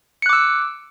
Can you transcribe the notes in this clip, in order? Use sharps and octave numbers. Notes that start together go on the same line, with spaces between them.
D6 E6 F#6 C#7